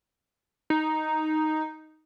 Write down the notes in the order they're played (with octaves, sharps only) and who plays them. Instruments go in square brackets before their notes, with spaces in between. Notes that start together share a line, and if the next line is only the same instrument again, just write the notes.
[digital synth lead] D#4